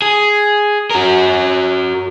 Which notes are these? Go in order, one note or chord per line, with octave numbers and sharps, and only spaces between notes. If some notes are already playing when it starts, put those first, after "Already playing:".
G#4
F#4 A#4